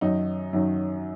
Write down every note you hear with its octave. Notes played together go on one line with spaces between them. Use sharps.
F#2 D#3 F#3 D#4
F#2 D#3 F#3